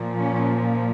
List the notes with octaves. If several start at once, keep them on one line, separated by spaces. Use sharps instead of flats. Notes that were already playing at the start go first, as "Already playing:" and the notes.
Already playing: A#2 F3
C#4